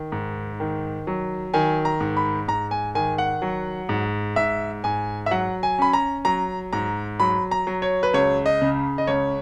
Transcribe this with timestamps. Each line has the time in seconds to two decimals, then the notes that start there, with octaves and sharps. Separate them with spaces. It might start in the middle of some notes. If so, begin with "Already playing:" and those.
Already playing: D#3
0.12 G#2
0.60 D#3
1.07 F#3
1.54 D#3 G#5
1.85 A#5
2.00 G#2
2.17 B5
2.48 G#2 A#5
2.71 G#5
2.95 D#3 G#5
3.18 F#5
3.42 F#3
3.89 G#2
4.36 G#2 E5
4.84 G#2 G#5
5.26 E5
5.31 F#3 F#5
5.63 G#5
5.79 C#4 B5
5.93 A#5
6.25 F#3 A#5
6.73 G#2 A#5
7.20 F#3 B5
7.51 A#5
7.67 F#3
7.82 C#5
8.03 B4
8.13 C#2 C#5
8.46 D#5
8.61 C#3
8.98 D#5
9.07 C#2 C#5